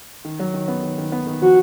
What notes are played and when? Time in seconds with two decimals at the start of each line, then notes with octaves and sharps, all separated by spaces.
0.25 D#3
0.39 F#3
0.54 D#3
0.68 B3
0.83 D#3
0.98 D#3
1.12 B3
1.27 D#3
1.42 F3 F#4